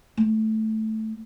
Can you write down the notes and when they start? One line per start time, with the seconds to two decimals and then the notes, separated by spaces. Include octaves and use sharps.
0.17 A3